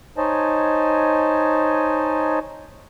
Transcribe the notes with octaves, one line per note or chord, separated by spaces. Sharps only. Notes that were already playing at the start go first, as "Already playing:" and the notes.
D#4 C5 C#5 D#5 G#5 A5